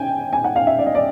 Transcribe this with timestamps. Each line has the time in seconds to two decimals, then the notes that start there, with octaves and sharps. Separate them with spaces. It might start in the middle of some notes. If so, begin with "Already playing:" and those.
Already playing: G5 G#5
0.33 G#5
0.44 F#5
0.56 F5
0.67 E5
0.79 D5
0.86 D#5
0.95 D5